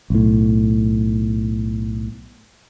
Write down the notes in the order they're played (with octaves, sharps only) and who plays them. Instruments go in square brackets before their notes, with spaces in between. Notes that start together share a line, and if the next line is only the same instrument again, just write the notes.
[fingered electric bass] B1 A2